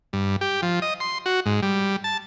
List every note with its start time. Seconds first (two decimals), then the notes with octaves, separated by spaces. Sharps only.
0.13 G2
0.41 G4
0.62 F3
0.82 D#5
1.00 C6
1.26 F#4
1.46 G#2
1.62 G3
2.04 A5